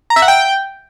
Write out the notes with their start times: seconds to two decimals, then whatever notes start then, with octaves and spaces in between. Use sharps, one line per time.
0.10 A#5
0.16 E5
0.22 F#5
0.28 G5